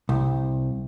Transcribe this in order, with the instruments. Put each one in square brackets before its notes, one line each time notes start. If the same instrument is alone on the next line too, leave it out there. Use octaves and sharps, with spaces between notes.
[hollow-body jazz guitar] C2